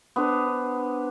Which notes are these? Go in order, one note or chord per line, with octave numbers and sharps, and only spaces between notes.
B3 D4 C5